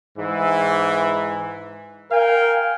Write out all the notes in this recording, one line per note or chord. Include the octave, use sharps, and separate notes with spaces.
G#2 E3
A#4 F5 G5 G#5